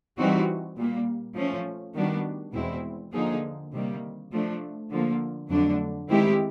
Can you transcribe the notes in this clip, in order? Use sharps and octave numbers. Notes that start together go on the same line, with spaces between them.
E3 G3 C4 D#4 F#4
A#2 G3 A#3
F3 A3 C#4
D#3 G3 B3 D4 F#4
E2 B2 G#3 C4 E4
D3 F3 A#3 D#4 G#4
C3 D#3 G3 A#3
F3 A3 D4
D3 F3 A#3
F2 D3 F#3 A3 D4
D#3 G#3 C4 E4 G4